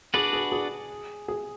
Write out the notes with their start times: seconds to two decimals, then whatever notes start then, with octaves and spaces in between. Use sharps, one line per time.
0.14 D4 F#4 G#4 B4 D5
0.33 G#4
0.52 G#4
1.28 G#4